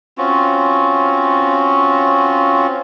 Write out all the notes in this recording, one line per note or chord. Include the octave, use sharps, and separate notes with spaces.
C4 C#4 F4 F#4